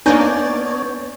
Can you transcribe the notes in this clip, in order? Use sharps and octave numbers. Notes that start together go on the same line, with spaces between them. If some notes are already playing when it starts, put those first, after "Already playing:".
A#3 B3 D4 D#4 C#5 D5 G#5 G6